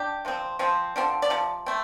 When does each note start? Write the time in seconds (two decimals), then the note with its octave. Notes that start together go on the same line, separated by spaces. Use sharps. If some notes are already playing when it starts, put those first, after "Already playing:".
Already playing: D4 G4
0.25 C3 F3 C4
0.59 F3 C4
0.96 D3 F3 C4
1.22 D5
1.30 C3 F3
1.66 A3 C4